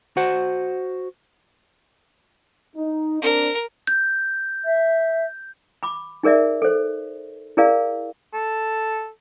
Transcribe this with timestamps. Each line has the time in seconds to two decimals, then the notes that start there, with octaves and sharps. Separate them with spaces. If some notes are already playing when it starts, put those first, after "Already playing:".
0.17 F#4 C5 F#5
2.76 D#4
3.22 C4 D4 A#4
3.87 G6
4.65 E5
5.83 B5 D6
6.23 D#4 G#4 A#4 D5 E5
6.62 A4 C5
7.57 E4 G#4 A#4 D5 F5
8.34 A4